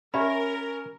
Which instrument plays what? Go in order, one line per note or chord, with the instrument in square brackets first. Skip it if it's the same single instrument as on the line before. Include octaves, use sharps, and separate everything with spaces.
[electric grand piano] C#4 [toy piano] G4 D5 B5 [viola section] A#4 [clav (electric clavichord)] E5 A#5